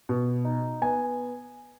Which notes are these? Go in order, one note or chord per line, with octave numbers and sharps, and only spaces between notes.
B2
D#4
B3 G#5